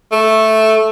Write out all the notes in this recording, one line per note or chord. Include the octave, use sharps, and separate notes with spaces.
A3